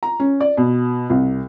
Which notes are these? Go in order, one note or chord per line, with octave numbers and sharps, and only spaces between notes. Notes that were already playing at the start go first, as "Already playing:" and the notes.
A#5
C#4
D5
B2
C2